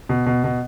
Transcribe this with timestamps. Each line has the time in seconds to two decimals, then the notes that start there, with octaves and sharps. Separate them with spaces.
0.09 B2
0.26 B2
0.44 B2